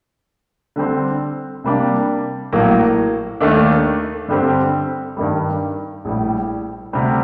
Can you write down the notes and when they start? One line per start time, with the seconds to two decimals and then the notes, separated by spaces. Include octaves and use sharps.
0.76 D3 G3 C4
1.64 C3 G3 A#3 D4
2.52 A#1 A2 F#3 A#3 F#4
3.41 D#2 D#3 A3 D4
4.28 G2 D3 G3 C4 G4
5.17 G2 D#3 G3
6.05 A#1 A2 G3
6.93 D2 C3 G3 C4